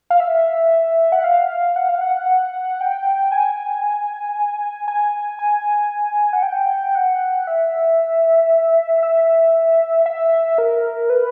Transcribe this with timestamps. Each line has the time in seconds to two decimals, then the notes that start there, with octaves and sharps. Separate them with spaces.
0.10 F5
0.20 E5
1.12 F#5
1.24 F5
1.76 F#5
1.89 F5
2.01 F#5
2.81 G5
3.32 G#5
4.88 G#5
5.39 G#5
6.33 F#5
6.43 G5
6.95 F#5
7.47 E5
9.03 E5
10.06 E5
10.58 A#4
11.10 B4